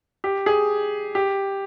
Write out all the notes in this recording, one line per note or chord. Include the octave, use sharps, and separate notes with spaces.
G4
G#4
G4